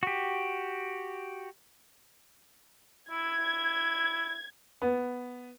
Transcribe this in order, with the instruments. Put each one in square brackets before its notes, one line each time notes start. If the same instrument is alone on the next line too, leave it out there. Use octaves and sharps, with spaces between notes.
[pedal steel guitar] F#4 G4
[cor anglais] E4 [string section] G#6
[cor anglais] E4
[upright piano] B3